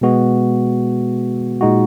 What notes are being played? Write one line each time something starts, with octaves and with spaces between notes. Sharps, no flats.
B2 G#3 B3 F#4
A#2 G#3 D#4 F#4